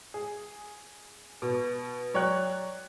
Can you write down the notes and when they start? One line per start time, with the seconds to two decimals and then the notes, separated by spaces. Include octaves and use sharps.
0.14 G#4
1.42 B2
2.14 F#3 C#5 D5 G5 F#6